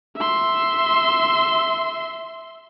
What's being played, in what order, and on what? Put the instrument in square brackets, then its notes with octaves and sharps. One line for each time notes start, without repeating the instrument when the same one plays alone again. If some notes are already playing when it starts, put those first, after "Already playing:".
[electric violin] E5 C6